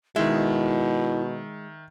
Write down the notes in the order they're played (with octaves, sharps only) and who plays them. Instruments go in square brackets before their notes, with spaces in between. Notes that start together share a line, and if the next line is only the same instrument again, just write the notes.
[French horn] B2 [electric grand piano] D#3 E5 [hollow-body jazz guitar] G#3 [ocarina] E4